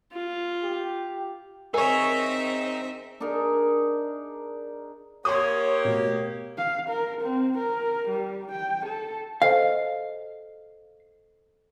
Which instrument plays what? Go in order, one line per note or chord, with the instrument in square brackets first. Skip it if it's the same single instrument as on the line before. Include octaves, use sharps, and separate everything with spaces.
[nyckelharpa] F4
[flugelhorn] G4
[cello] C4 E5 [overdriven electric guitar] D#4 [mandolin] G#4 C#5 [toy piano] A#4
[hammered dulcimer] D4 D#4 G#4 A#4
[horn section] A#3 G4 [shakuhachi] C#5 [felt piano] C6 C#6 D#6
[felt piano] B2 A3
[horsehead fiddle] F5
A#4
C4
A#4
G3
G5
A4
[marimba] A4 C5 D#5 [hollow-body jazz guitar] F5